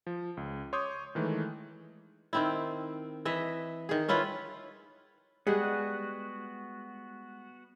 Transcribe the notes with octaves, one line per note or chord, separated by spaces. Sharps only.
F3
C#2
C#5 C6 D6 D#6 G6
D#3 E3 G#3 A3
D#3 C4 E4
E3 D#5 E5
D#3 G#4
C#4 E4 F4 B4
G3 G#3 B3 F#4 G#4 F#5 D#6 G#6